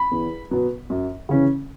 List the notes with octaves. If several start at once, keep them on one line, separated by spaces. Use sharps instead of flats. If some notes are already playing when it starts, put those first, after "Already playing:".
Already playing: B5
E2
B2 F#3 B3
F#2
C#3 E3 C#4